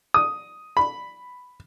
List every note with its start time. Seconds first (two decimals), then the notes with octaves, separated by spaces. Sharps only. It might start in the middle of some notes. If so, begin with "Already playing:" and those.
0.14 D#6
0.77 B5